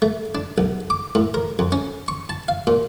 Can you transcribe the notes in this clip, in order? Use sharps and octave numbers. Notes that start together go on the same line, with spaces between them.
A3
D4
B1
D6
A2
A#4
F2
C#4
C#6
A5
F5
A#2